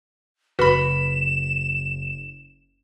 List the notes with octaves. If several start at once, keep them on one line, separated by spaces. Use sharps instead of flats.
F#1 F#4 B4 B5 B6 E7